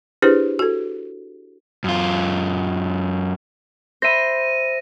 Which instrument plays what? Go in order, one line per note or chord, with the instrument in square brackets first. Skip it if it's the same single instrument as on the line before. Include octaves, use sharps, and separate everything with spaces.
[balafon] D4 E4 G4 G#4 B4 C5
F#4 A4
[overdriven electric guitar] F#2 F4
[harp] C5 E5 B5 [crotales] A#6 D#7